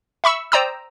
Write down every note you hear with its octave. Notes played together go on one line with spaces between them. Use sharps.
E5 B5 C#6 E6
C5 D5 G5 A#5 D#6 E6